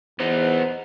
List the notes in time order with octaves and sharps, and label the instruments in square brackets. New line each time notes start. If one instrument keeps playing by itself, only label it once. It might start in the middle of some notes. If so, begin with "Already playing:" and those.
[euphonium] E2 [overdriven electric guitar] B3 D#4 [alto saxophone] C5